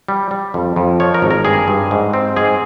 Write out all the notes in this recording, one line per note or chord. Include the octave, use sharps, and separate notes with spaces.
G3
G3
F2
F2
F3 C#5
A#4
G#1
A#4
G2 G#4
G2
G#2
C4
G#2 G#4